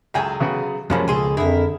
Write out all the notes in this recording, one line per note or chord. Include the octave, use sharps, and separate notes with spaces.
C#2 F#3 G#4 A4 G5 G#5
C#3 B3 F#4
F#2 C3 E3 F3 G#3 A#3 C#4 B5
C#2 B2 G#4 A4 G#5 C6
F2 D3 E4 G#4 A#4 E5